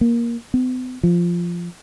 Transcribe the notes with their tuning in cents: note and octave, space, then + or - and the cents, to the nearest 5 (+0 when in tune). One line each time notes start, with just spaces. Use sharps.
A#3 +15
B3 +45
F3 -10